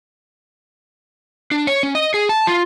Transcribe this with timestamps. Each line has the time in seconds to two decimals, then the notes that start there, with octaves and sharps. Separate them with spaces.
1.51 D4
1.67 C#5
1.83 C#4
1.95 D#5
2.14 G#4
2.29 A5
2.47 F4